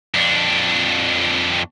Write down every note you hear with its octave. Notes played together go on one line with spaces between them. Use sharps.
F2 D4